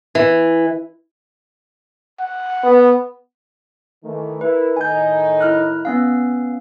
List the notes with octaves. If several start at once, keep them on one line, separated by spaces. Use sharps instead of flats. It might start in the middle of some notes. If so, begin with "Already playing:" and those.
E3
F#5
B3
D#3 E3 A3
E4 A#4 B4
A2 D#3 D#4 G#5 G6
E4 F6 F#6
B3 C#4 F5